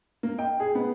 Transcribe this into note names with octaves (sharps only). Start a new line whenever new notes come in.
A#3
G5
G#4
B3